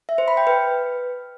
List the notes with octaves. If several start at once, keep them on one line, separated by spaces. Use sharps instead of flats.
E5
C5
B5
G5
B4